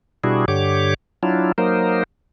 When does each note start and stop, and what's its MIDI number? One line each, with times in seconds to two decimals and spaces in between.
0.24 0.45 47
0.24 0.45 55
0.24 0.45 62
0.24 0.45 64
0.24 0.45 66
0.24 0.45 68
0.48 0.94 43
0.48 0.94 50
0.48 0.94 67
0.48 0.94 73
0.48 0.94 86
1.23 1.52 54
1.23 1.52 62
1.23 1.52 64
1.23 1.52 65
1.58 2.03 54
1.58 2.03 58
1.58 2.03 63
1.58 2.03 70
1.58 2.03 72